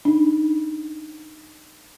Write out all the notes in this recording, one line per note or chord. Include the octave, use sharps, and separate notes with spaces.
D4 D#4